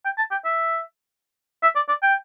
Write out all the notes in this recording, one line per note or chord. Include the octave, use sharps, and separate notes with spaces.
G5
A5
G5
E5
E5
D5
D5
G5